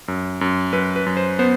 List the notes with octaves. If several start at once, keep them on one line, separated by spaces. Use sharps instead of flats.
F#2
F#2
F#2 B4
B4
F#2
C5
B3 C5